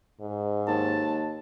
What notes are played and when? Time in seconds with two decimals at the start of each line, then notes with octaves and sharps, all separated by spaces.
0.21 G#2
0.68 D#2 A5